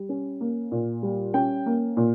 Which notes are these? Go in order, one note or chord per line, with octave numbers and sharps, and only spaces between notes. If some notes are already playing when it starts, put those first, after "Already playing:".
Already playing: G3
C#4
A#3
A#2
G3
C#4 G5
A#3
A#2